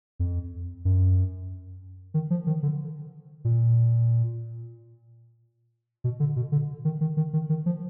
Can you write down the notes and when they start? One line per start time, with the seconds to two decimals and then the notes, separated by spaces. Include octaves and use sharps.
0.20 F2
0.85 F#2
2.14 D#3
2.30 F3
2.47 D#3
2.63 D3
3.45 A#2
6.04 B2
6.20 D3
6.36 B2
6.52 D3
6.85 D#3
7.01 D#3
7.17 D#3
7.33 D#3
7.50 D#3
7.66 F3